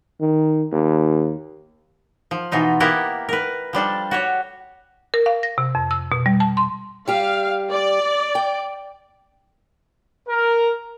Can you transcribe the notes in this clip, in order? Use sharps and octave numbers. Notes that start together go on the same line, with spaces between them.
D#3
D#2
F3
B2 E3 D#4 F4
A#3 B3 E4 G4 A#4 F#5
A#4 B4
F3 G3 D4 A4
F#4 G4 C#5
A#4
F5
A#6
C3
F2
E6
B2
G3
A5
C6
G3 G4 F5
D5
G5
A#4